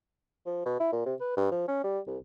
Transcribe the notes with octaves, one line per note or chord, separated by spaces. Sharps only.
F3
B2
E4
A#2
C3
B4
G2
F3
C#4
G3
C2